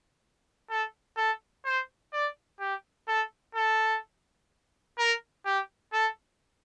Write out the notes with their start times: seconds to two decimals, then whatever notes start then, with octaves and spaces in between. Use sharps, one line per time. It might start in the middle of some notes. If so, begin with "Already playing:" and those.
0.69 A4
1.17 A4
1.65 C5
2.13 D5
2.60 G4
3.08 A4
3.55 A4
4.98 A#4
5.46 G4
5.93 A4